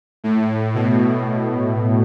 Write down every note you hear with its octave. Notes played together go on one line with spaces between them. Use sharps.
A2
B2